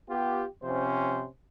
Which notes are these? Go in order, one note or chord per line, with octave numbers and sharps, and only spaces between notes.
B3 F4 G4
C3 F3 C#4 C5